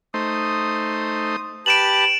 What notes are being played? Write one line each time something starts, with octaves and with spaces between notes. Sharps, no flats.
A3 D#4 C5 D#6
G4 B4 A5 D7 E7 F#7